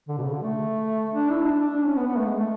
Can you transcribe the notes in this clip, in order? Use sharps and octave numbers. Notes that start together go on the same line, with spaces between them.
D3
B2
C#3
D3
A3
D4
E4
D4
D4
D4
C#4
B3
B3
A3
G#3
A3